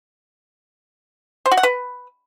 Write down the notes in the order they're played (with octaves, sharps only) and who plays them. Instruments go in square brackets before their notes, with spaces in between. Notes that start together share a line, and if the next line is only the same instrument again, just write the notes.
[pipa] C5
F#4
F#5
B4